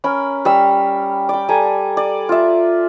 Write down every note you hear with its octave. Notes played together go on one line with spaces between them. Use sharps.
C#4 A#4 B5
G3 C#5 E6
D5 G5
G3 A4 G#5 A#5
D5
F4 E5